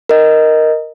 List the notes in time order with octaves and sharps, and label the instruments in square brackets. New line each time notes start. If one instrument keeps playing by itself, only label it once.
[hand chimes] A#4 D#5